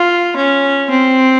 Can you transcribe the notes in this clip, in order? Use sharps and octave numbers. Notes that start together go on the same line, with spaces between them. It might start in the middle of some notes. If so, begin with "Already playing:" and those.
Already playing: F4
C#4
C4